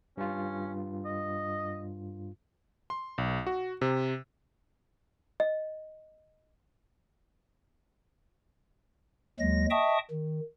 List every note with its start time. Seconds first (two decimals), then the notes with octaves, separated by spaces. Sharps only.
0.17 G2 C#4 F4
1.05 D#5
2.90 C6
3.18 B1
3.47 F#4
3.81 C3
5.40 D#5
9.39 D#2 F#3 G#3 A#6
9.70 D#5 E5 G5 A5 C#6 D#6
10.11 D#3